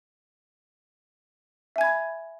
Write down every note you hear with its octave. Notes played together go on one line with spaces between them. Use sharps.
E5 G#5 B5 G#6